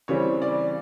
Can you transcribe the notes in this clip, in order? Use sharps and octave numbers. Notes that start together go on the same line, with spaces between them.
C#3 E3 G3 C4 C#5
D5